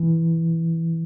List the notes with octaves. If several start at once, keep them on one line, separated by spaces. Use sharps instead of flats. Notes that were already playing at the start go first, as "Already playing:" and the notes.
Already playing: E3